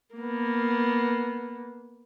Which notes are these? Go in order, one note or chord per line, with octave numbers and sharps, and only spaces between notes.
A#3 B3